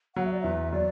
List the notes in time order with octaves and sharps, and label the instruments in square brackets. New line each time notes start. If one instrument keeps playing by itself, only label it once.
[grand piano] F#3 [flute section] F#5
[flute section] E5
D5
[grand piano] E2 [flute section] E5
[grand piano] F#3 [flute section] D5